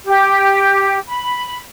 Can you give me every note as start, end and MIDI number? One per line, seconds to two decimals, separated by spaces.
0.05 0.97 67
1.07 1.59 83